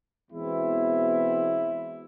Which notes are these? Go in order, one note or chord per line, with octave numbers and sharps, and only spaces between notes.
E2 B2 G#3 C4 E4